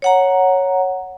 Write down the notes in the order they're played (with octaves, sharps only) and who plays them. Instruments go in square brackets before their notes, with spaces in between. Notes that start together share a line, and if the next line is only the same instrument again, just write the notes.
[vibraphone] C#5 F#5 A#5